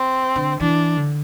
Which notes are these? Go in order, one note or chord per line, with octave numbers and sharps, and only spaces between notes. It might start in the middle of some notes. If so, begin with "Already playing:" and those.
Already playing: C4
D3
E3 D4
D3